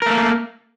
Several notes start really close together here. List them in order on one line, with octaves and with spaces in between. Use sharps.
A#4 A3 A#3